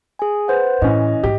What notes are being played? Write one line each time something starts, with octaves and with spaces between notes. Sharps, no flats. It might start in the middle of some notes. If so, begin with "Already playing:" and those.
G#4 G#5
B4 C5 F#5
A2 E3 C#4 D#5
G#2 G4